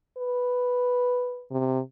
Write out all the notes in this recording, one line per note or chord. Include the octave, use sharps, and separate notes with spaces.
B4
C3